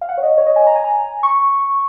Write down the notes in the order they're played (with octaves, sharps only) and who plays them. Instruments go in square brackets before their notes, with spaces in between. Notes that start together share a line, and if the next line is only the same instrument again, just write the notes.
[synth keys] F5
F#5
C#5
D#5
C#5
D#5
G#5
A#5
G#5
A#5
C#6